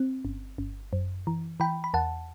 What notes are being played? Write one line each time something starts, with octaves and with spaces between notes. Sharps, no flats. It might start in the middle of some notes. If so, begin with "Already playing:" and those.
Already playing: C4
G1
G1
F#2
E3
E3 G5 B5
B5
E2 F#5 A5